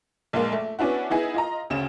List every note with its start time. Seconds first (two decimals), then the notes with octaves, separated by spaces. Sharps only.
0.33 A#1 G#3 A#3
0.52 A3
0.79 B3 C#4 D4 E4 F#4
1.10 B3 D#4 E4 G#4
1.35 F4 D#5 A#5
1.70 D2 C#3 E7